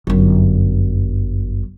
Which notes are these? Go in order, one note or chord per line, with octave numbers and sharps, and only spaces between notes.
G1 F#2